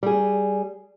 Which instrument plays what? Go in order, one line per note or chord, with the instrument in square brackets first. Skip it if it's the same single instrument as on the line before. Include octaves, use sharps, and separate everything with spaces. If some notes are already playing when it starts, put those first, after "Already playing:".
[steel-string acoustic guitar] G3 G#4